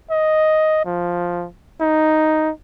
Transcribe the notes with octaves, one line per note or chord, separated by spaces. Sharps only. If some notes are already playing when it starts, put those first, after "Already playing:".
D#5
F3
D#4